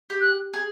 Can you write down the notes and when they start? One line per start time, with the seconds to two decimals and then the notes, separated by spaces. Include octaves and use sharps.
0.10 G4
0.21 F#6
0.54 G#4